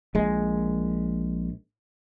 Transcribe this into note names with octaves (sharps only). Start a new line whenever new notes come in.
A#1 G#3